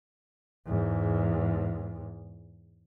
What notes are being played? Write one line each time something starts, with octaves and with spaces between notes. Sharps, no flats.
E2 G#2